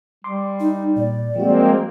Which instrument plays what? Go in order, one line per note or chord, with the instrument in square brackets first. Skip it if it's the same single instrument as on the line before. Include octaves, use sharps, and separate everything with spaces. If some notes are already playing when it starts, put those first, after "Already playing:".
[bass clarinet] G3 [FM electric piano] C6 D6
[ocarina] D#4
[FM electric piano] A#2 [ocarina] D5
[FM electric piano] F3 G3 F#4 [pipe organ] G#3 A#3 C4